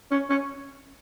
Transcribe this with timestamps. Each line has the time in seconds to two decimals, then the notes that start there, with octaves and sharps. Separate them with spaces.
0.11 C#4
0.30 C#4